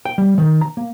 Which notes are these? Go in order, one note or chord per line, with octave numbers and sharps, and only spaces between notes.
G5
G3
D#3
A#5
A#3